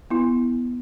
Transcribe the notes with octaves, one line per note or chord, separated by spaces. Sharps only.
B3 E4